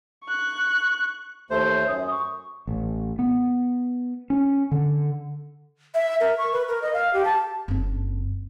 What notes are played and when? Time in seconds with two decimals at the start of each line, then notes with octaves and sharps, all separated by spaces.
0.24 C#6 F#6
1.50 D#2 A3 C5
1.69 C#5
1.88 F#2 D#6
2.11 C#6
2.67 A1
3.19 B3
4.30 C#4
4.71 D3
5.94 E5
6.20 A#4
6.38 C#6
6.52 B4
6.68 A#4
6.82 D#5
6.93 F5
7.13 G4
7.25 A5
7.68 F#1 C4